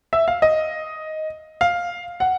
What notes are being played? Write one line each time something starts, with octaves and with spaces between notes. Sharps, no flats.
E5
F5
D#5
F5
F#5